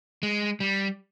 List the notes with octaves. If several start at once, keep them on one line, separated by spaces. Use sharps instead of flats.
G#3
G3